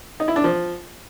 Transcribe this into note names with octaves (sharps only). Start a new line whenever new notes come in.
D#4
E4
D4
F3